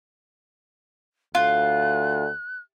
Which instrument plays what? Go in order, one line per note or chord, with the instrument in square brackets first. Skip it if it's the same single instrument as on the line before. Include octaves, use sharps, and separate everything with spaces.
[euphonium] D2 [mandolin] F4 [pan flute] F#6